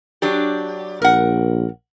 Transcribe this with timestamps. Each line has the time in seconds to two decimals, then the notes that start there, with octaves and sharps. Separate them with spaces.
0.22 F#3 D4 G4
1.02 A#1 A#4 F#5